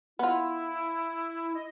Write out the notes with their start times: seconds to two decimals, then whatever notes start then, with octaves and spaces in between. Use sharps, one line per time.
0.19 B3 E4 F4
1.55 D#5